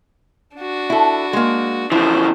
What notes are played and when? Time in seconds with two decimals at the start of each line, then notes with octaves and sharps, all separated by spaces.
0.57 D4 F#4
0.90 E4 A4
1.33 G#3 A#3
1.92 C#3 E3 F3 C5